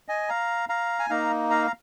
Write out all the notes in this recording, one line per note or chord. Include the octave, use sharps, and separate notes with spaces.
D#5 G#5
F5 A#5
F5 A#5
G#5
A#3 D#4 F5 A#5
F5 A#5
A#5